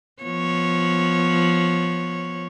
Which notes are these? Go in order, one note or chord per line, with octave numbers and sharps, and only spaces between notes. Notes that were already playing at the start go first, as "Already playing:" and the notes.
F3 B3 C#5